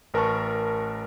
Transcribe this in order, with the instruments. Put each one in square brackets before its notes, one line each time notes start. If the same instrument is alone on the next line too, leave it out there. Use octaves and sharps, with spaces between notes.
[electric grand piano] A1 A#4 B4 A5 C#6